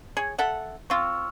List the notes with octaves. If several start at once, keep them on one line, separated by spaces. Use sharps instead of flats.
G#4 C#5
A4 E5 F#5
C4 F4 C#6 E6 F6